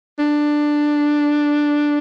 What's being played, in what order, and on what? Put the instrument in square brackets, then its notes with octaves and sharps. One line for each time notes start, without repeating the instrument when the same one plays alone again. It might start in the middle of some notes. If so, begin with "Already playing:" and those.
[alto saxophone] D4